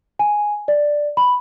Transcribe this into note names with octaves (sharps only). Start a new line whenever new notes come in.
G#5
D5
B5